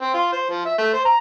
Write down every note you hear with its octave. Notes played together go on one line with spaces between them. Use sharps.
C4
F4
C5
F3
E5
A3
C5
A#5